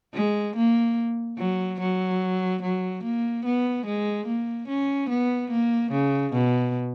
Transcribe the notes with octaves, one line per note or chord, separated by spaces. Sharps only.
G#3
A#3
F#3
F#3
F#3
A#3
B3
G#3
A#3
C#4
B3
A#3
C#3
B2